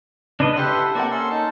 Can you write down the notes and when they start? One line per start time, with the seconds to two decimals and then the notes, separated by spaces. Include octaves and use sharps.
0.40 C#3 D4 B4 D#5
0.57 E4 G4 A4 B4 F#5 C6
0.95 C3 A#3 A#4 D5 F#5
1.11 C#4 C6 E6
1.30 D#4 A5